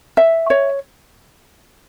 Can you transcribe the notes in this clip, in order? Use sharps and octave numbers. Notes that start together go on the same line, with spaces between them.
E5
C#5